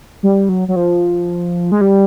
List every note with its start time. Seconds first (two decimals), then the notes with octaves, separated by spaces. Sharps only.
0.23 G3
0.49 F#3
0.68 F#3
0.76 F3
1.72 G#3
1.81 G3